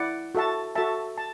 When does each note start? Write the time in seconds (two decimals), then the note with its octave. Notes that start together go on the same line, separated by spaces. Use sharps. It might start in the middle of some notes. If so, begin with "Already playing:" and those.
Already playing: E4 D5 F#5
0.35 F#4 A4 E5 A5
0.75 F#4 A4 E5 A5
1.18 A5